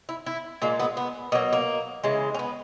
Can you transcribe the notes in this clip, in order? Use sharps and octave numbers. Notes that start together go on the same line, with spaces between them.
E4
E4
A#2 G#3 A#3
B3
B3
B2 F#3 A#3
A#3
C#3 E3 G#3
C#4
B3